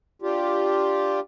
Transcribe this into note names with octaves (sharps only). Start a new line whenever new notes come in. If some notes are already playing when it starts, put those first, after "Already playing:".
D4 F4 G4